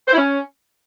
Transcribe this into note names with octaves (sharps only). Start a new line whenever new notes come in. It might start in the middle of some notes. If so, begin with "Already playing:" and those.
C5
E4
C#4